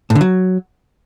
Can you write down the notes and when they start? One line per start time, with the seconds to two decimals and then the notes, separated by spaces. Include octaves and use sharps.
0.10 A2
0.15 D3
0.21 F#3